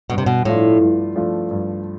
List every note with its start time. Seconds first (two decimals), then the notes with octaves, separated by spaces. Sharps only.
0.10 G2 B2
0.18 C3
0.26 B2
0.45 A2 F3 A3 D4 F4
0.80 G2
1.16 F3 A3 D4 F4
1.51 G2